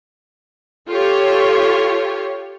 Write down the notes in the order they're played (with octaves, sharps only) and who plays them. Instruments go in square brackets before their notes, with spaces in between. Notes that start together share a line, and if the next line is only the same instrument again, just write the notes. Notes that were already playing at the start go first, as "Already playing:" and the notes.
[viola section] F4 G4 A4 C#5